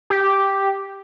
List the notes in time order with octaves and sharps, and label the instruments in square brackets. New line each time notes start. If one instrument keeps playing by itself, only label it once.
[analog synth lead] G4